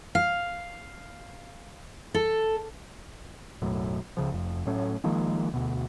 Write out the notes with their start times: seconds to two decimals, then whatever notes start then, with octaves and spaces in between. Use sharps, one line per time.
0.15 F5
2.14 A4
3.62 B1 F#2 A2
4.17 C#2 C#3 F3
4.32 F1 F2
4.67 A2 F#3 A3 C#4
5.04 D#3 F3 G#3 A#3
5.54 D2 B2